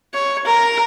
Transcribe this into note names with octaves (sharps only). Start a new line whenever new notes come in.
C#5
A#4